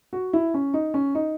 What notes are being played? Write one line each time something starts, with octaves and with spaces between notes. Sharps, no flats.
F#4
E4
C#4
D#4
C#4
D#4